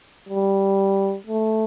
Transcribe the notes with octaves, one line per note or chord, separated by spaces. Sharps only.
G3
A3